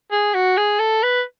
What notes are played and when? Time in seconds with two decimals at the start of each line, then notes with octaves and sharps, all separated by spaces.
0.12 G#4
0.34 F#4
0.57 G#4
0.79 A4
1.03 B4